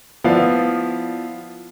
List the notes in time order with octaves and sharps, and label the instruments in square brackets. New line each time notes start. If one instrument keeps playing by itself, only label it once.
[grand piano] F3 B3 E4 D5 F5